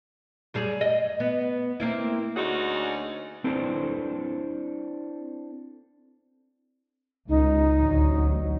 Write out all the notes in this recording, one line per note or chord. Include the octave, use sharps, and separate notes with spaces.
F#2 G3 G#4
D#5
B3
A#3 C4 E4
D2 C#4 D#4 F#4 G#4
C4 D4 E4 A4 B4 C5
C#2 D#4
A1 D2 F#3